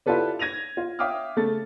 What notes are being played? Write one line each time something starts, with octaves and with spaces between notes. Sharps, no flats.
E4 F4 G4 A4 B4 D5
G#6 A#6 D#7 F7
F4
E5 F5 G5 D6 D#6 F6
C#3 A3 A4 A6